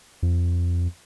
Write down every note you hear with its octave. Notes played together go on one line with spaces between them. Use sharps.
F2